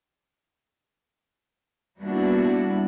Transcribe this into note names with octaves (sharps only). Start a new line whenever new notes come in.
G3 A#3 B3 D4 E4 F#4